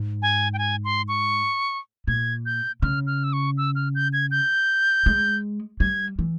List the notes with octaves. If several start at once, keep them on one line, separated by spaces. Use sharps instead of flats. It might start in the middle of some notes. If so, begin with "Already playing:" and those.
Already playing: G#2
G#5
G5
G#5
C6
C#6
A#2 G#6
G6
C#3 F6
F6
E6
C#6
E6
F6
G6
G#6
G6
G#3
G3 G#6
E3